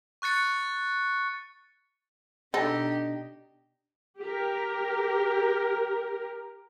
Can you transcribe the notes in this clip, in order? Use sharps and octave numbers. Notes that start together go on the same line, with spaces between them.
C#6 F#6 A6 C#7
B2 D4 D#4 G4 A4
G4 A#4